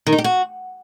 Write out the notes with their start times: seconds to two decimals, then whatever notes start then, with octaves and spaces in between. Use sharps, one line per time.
0.07 D#3
0.13 D#4
0.18 G4
0.24 F#4